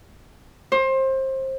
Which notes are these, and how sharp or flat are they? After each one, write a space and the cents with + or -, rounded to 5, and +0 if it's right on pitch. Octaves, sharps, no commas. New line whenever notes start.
C5 +25